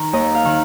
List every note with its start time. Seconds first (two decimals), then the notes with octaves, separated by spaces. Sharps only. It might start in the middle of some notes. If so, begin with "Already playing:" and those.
Already playing: D#3
0.13 D#2 D#5
0.35 F5
0.45 D#3